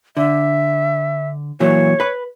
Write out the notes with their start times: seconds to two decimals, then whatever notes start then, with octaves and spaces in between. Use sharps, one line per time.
0.17 D3 E5
1.60 A#2 E3 F#3 C#5
2.00 B4 B5